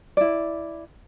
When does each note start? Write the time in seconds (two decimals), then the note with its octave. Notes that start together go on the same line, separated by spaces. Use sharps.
0.17 E4 D5